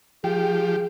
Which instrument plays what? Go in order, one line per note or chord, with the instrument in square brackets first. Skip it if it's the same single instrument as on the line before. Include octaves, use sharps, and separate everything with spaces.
[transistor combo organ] F3 G4 [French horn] G#4 [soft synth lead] G5